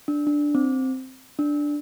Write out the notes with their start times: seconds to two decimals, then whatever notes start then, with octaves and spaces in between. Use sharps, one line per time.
0.08 D4
0.27 D4
0.55 C4
1.39 D4